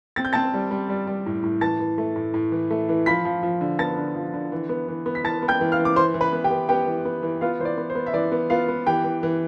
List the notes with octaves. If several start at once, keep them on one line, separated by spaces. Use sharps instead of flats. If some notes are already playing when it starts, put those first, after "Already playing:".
C4 A6
G6
C4 A5 A6
G3
G3
G3
G3
A2
A2
E3 A5 A6
E3
A3
A2
A2
E3
A3
E3
F3 B5 B6
F3
F3
D3
B3 A5 A6
D3
F3
D3
E3
B3
E3
B3
B6
E3 A5 A6
B3
G5 G6
E3
F5 F6
E3
D6
E3 C5 C6
E3
B4 B5
B3
G4 G5
B3
B3 G4 G5
E3
B3
E3
B3 F4 F5
E3 C5
D5
B3
C5
B3
E5
E3 D5
B3
B3 F4 F5
B3
E3 G4 G5
E3
E3